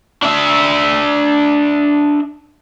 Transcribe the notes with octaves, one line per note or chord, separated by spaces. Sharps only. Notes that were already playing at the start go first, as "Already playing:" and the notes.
D4 E5